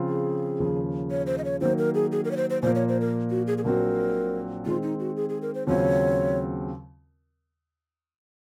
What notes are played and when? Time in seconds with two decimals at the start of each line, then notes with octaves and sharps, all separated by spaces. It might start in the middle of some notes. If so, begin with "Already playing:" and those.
Already playing: C#3 F3 C4 F4
0.08 G#4
0.60 D#2 C#3 F3
1.11 C#5
1.27 C5
1.38 D#5
1.44 C#5
1.61 D#3 F#3 A#3 C5
1.78 A#4
1.95 G#4
2.12 G#4
2.25 A#4
2.31 C#5
2.37 C5
2.50 C5
2.62 A#2 F3 A#3 C5
2.75 C#5
2.89 C5
3.01 A#4
3.30 F#4
3.47 G#4
3.58 G#4
3.64 A#1 A#2 F#3 C4 F#4 A#4
4.66 D#3 G#3 C4 F4
4.83 D#4
4.99 F#4
5.17 G#4
5.29 G#4
5.42 A#4
5.54 C5
5.67 D#2 C#3 F#3 C4 F4 C#5